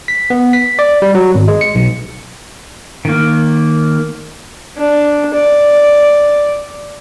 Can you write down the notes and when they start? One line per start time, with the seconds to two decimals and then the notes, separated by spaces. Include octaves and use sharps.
0.08 B6
0.30 B3
0.53 B6
0.79 D5
1.02 G3
1.15 F#3
1.35 G#1
1.48 G#3
1.61 C#7
1.75 B1
3.05 D#3 A#3
4.78 D4
5.35 D5